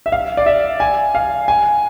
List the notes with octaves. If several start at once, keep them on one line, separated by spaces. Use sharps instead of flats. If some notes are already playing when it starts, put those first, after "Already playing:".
E5
F5
D5
E5
G#5
F5
G#5